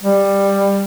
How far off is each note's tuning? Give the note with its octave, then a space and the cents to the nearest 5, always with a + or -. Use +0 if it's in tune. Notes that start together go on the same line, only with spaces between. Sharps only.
G3 +15